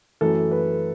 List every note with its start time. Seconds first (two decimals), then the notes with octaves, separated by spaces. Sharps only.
0.21 F#2 E3 A3 A4
0.51 B4